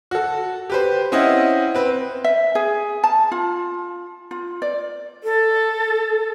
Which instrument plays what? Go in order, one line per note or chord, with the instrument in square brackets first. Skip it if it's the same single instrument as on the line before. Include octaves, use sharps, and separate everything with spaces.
[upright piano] F#4 A4
G4 B4 C5
C4 C#4 E4 D#5 F#5
C4 B4
[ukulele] E5
G#4
A5
F4
F4
D5
[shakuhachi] A4